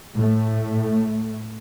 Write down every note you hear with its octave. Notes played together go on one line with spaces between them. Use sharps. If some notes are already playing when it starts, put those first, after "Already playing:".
A2 A3